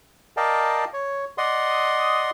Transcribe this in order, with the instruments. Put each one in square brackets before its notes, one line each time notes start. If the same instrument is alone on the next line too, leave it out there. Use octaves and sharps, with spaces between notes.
[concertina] A#4 D5 D#5 F5 G5 A5
C#5
D5 D#5 F#5 C6 D#6